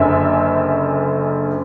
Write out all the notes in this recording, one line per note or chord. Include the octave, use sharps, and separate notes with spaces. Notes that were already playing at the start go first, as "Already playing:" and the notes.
Already playing: F#1 F#2 D3 E5